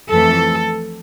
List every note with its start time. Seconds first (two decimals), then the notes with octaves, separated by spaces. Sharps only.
0.11 F2 E3 A3 A4